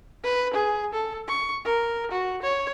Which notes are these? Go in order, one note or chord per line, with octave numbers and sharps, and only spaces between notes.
B4
G#4
A4
C#6
A#4
F#4
C#5